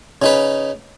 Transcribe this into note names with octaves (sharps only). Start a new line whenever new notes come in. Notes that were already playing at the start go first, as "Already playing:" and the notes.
C#3 D#4 B4